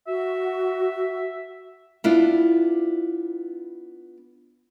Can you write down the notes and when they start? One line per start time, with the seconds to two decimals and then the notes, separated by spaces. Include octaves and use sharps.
0.07 F#4 E5
2.04 B3 D4 E4 F4